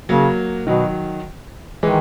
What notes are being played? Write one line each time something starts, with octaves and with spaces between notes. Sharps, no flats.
C#3 F#3 A#3
B2 D#3 F#3
D#3 E3 G#3